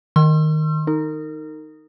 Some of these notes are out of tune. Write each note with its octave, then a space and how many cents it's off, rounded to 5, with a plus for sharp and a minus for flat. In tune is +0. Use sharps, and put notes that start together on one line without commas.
D#3 -5 C6 +35 E6 +40
D#4 +0 A#4 -30